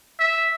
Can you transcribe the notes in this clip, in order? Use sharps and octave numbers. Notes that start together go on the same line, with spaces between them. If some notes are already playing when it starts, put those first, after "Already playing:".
E5